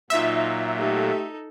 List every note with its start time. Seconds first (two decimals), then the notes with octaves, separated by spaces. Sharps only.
0.10 A#2 F#3 D#4 F4 E5
0.79 A3 D#4 G4 A4